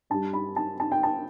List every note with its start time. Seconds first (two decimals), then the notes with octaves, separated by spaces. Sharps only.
0.10 G2 G3 A5
0.33 B5
0.56 A5
0.80 A5
0.92 G5
1.03 A5